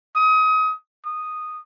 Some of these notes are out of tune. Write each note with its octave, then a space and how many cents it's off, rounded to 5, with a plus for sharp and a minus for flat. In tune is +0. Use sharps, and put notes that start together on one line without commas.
D#6 +30
D#6 -5